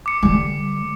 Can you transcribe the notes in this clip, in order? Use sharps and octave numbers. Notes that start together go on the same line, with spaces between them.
D6 C#7
D3 G3 D6